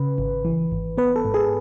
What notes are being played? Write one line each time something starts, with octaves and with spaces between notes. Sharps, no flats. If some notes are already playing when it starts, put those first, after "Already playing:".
Already playing: C#3 B4
G#1
E3
G#1
B3 B4
A4
G#2
G#4